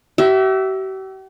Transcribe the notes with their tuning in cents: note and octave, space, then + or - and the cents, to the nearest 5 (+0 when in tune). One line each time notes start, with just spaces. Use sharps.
G4 -45 E5 +0